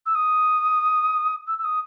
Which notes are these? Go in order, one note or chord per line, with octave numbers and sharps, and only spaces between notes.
E6
D#6
E6
E6
D#6